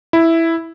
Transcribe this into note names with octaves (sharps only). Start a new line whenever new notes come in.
E4